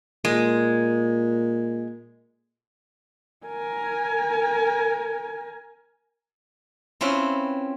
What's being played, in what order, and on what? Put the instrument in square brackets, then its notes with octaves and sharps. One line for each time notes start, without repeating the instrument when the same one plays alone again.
[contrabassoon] A#2 [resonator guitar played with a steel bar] G#3
[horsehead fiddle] A#4 G#5
[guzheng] C4 C#4 E4 F4 B4 C6